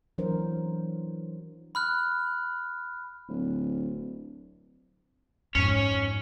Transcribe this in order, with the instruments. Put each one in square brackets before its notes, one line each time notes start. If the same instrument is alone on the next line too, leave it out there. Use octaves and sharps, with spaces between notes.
[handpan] E3 F#3 D4 A#4 C5
[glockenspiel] B5 F6 F#6
[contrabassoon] D1
[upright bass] F2 G#2 [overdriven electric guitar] C#4 C#5